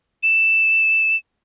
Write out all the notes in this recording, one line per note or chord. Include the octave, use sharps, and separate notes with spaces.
E7